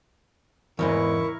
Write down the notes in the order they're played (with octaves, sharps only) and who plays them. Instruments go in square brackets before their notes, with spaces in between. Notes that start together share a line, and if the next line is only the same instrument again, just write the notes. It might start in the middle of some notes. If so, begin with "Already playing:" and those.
[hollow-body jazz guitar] E2 G#2 C#3 [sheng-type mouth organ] E4 A#4 C#6